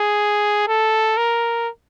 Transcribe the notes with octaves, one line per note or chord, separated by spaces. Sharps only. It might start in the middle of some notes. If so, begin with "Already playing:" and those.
Already playing: G#4
A4
A#4